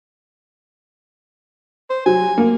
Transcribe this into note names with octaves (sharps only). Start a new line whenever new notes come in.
C5
F#3 G#5
A#3